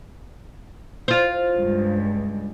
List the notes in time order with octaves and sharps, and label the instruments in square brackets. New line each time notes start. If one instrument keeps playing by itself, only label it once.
[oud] F4 C5
[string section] C#2 G2